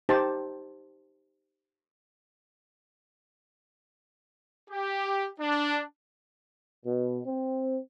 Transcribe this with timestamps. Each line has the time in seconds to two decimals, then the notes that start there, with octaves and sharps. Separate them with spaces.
0.09 D#4 G4 C5 A5
4.70 G4
5.40 D4
6.84 B2
7.26 C4